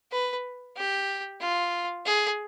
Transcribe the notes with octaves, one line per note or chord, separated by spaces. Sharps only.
B4
G4
F4
G#4